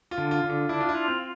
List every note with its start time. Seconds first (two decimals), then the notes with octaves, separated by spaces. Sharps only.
0.11 F4
0.18 D3
0.31 F4
0.44 D3
0.49 F4
0.69 D4 E4
0.80 F4
0.89 E4
0.95 F4
1.08 C4